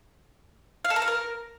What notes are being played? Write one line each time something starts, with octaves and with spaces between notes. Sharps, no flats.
F5
A4
A#4
F5
A#4